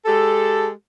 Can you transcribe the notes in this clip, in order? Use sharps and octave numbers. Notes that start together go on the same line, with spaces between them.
G#3 G4 A4